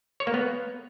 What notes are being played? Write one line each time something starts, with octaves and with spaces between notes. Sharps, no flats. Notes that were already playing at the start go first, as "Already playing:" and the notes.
C#5
A#3
B3